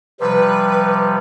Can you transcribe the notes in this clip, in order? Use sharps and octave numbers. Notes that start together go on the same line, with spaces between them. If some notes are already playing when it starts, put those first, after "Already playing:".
C3 F3 G3 B4